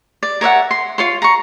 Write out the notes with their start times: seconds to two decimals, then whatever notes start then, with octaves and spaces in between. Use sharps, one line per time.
0.23 D5
0.41 A#4 C#5 E5 F#5
0.71 C6
0.98 F4 C#5 C6
1.22 A#5 C#6